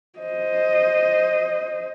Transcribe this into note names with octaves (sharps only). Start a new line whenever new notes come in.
C5 D#5